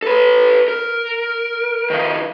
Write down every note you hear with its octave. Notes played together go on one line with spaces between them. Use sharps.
A4 B4
A#4
D#3 F3